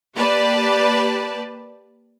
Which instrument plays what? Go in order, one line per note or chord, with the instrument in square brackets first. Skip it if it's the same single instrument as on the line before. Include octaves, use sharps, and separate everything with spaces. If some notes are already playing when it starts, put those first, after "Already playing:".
[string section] A#3 G4 B4 D5 A5